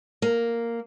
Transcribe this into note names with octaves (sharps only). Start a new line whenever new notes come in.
A#3